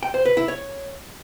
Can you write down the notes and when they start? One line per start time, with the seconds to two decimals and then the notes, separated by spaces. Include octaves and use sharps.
0.03 G5
0.14 C5
0.25 B4
0.37 E4
0.48 C#5